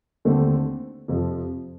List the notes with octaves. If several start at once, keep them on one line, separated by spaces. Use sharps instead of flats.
D#2 D3 A3 C4
F2 C3 F3